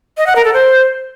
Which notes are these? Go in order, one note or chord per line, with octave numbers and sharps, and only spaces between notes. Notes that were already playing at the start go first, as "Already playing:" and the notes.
D#5
F#5
A#4
A4
C5